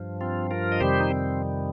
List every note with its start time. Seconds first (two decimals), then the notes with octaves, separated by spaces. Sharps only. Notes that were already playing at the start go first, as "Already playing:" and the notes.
Already playing: G2 F3
0.21 C4 F4
0.51 F4 A#4
0.72 D#5
0.80 F2 C3 D#3 G3 G4 C5
1.00 D#4
1.11 C4